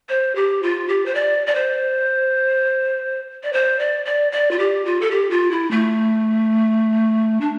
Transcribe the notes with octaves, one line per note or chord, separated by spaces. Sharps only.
C5
G4
F4
G4
C5
D5
D5
C5
D5
C5
D5
D5
D5
F4
G4
F4
A4
G4
F4
E4
A3
D4